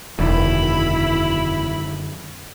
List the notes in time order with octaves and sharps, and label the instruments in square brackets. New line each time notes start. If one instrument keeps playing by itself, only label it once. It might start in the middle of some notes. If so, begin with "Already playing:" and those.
[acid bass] E1 [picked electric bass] F#2 D3 D#3 [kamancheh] E4 B5